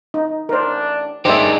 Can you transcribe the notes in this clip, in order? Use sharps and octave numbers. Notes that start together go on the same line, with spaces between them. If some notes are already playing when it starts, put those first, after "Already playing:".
D#4
A1 D4 A#4 C5
A3 D4 D#4 G4 G#4 A#4 C5 E5